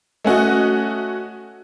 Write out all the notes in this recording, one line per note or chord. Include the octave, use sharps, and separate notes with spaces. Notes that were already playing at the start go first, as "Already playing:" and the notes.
A3 C#4 F#4 D#5